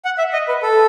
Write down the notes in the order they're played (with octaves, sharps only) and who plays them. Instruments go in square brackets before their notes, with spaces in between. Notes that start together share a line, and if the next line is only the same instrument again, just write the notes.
[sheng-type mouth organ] F#5
E5
D#5
B4
A4